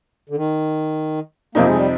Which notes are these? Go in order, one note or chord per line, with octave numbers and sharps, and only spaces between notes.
D3
D#3
F2 C3 F3 A#3 C4 D#4
G#3
G3